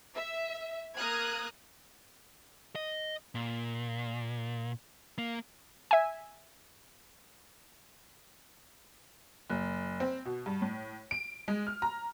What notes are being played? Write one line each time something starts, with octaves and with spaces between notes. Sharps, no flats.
E5
A#3 A#5 D#6 F6 F#6 G#6
D#5
A#2
A#3
E5 G#5
F#1
C4
B2
G2
A2
D7
G#3
F6
A#5